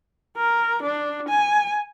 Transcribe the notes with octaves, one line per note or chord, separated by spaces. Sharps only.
A#4
D4
G#5